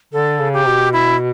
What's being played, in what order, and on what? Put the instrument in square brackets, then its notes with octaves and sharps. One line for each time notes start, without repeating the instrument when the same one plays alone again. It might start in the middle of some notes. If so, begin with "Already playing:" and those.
[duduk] D3 [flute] A4
[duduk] C#3
[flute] G4
[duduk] B2
[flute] E4